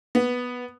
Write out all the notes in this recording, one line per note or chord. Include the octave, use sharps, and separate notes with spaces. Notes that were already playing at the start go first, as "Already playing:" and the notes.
B3